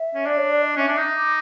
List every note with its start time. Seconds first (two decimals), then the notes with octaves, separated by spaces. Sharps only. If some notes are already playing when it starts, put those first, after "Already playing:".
Already playing: E5
0.15 C#4
0.25 D4 D5
0.37 C#5
0.50 D5
0.62 D#5
0.77 C#4 E5
0.88 D4
0.98 D#4
1.17 D6